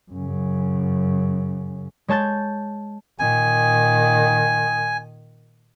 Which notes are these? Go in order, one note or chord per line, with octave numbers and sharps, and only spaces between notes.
F#2 C#3
G#3 C#5 A5 G6 A6
A#2 D#3 G#5